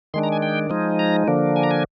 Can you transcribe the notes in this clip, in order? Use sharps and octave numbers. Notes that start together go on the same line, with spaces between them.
D#3 G#3 D4 C6
A#5
G#5
G5
F3 G#3 D#4
A#5
D3 F3 A#3 D4
G#5
A#5
G#5